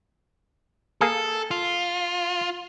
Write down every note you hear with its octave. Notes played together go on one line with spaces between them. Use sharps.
A#3 G#4 A4
F4